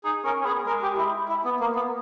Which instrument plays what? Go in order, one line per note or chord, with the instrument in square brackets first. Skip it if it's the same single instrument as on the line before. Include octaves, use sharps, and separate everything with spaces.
[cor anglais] D#4 [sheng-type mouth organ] G#4
[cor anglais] C#4 [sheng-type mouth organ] A#4
[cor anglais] C#4
[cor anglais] B3 [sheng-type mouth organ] G#4
[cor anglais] G#3 [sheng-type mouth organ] A#4
[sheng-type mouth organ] G4
E4
E4
B3
A#3
B3